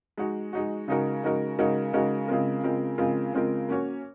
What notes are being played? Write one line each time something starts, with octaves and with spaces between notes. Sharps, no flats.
G#3 D#4 F#4
G#3 D#4 F#4
C#3 G#3 D#4 F#4 A#4
C#3 G#3 D#4 F#4 A#4
C#3 G#3 D#4 F#4 A#4
C#3 G#3 D#4 F#4 A#4
C#3 G#3 C4 F4 A#4
C#3 G#3 C4 F4 A#4
C#3 G#3 C4 F4 A#4
C#3 G#3 C4 F4 A#4
A#3 C#4 F#4 C#5